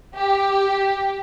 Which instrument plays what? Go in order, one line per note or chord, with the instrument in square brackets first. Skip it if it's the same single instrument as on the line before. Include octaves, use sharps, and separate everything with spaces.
[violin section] G4